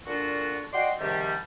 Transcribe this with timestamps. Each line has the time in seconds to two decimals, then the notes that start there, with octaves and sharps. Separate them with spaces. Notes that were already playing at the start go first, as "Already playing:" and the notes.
0.06 A#2 D3 D4 F4 F#4
0.72 F#4 D5 D#5 G5 C6
0.99 G#2 C3 D#3 F3 G3